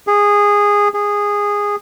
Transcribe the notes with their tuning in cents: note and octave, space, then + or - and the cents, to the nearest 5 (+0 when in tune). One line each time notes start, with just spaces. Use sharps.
G#4 -15
G#4 -15